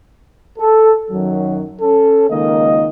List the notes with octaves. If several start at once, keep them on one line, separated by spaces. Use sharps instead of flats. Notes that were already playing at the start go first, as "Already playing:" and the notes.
A4
F#2 D#3 F#3
C#4 A4
C#2 D#3 A#3 D#5